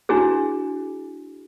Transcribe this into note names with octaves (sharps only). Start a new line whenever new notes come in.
D4 E4 F#4 G#4